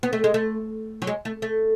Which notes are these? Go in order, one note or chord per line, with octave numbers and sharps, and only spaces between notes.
B3
A3
G#3
A3
F#3
G#3
A3
A3